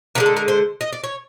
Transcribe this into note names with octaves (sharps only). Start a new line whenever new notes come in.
D3 F3 G#3 A#4
A4
A#4
C5
D#5
D5
C#5